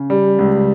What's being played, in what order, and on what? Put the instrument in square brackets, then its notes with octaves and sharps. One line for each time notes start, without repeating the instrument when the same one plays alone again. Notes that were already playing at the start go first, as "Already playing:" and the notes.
Already playing: [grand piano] C#3
G3
C#2